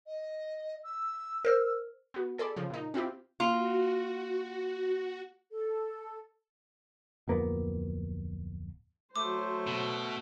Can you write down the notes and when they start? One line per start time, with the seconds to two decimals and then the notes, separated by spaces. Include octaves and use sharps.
0.07 D#5
0.84 E6
1.45 A#4 C5 F6
2.14 B3 F#4
2.38 G#4 A4 D5 B5
2.56 C#3 F3
2.70 A#2 D#4
2.94 C4 E4 F4 G4
3.40 A#3 F4 F#4
5.51 A4
7.28 D1 F2 A#3 B3
9.16 F#3 A3 C5 D6
9.67 B2